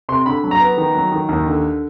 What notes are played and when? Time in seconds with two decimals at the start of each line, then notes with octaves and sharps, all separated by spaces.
0.09 C3 C6
0.26 D3 B5
0.44 F#3
0.51 A#5
0.61 B3
0.77 D#3
0.94 F#3
1.12 D#3
1.29 D#2
1.46 D3